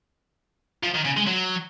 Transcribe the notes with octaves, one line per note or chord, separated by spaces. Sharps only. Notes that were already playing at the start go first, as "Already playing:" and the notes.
F3
D#3
C#3
G#3
F#3